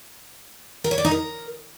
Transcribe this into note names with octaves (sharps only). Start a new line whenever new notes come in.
A#4
C#5
D5
D#4
A#4